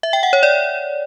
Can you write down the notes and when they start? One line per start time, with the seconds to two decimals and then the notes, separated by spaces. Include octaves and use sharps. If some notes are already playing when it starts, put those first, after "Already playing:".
0.03 E5
0.13 G5
0.23 F#5
0.33 C#5
0.43 D5